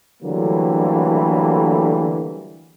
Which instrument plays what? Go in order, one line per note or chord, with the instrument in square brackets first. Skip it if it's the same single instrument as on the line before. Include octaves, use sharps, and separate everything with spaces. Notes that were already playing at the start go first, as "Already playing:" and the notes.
[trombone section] D3 E3 F#3 G3 A3 A#3